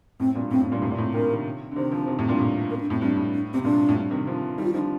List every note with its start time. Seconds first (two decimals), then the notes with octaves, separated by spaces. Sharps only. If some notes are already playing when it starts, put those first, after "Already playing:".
0.20 A2 C4
0.35 G2 A#2
0.51 A2 C4
0.61 A2
0.72 G2 A#2
0.82 A2 C3
0.91 A#2
0.98 A2 C3
1.13 A#2 D3 A#4
1.29 C3 D#3
1.71 D3
1.76 C3 D#3 C5
1.91 D3 F3
2.08 C3 D#3
2.18 A2 C3
2.29 G2 A#2
2.40 A2
2.70 A#4
2.76 C4
2.81 D4
2.90 A2 C4
3.01 G2 C4
3.17 A2
3.33 D4
3.53 C3 C4
3.64 G2 A#2 D4
3.89 A2
3.96 G2
4.11 C3 D#3
4.27 D3 F3
4.58 D#3 G3 D#4
4.65 F4
4.73 D3 F3 D#4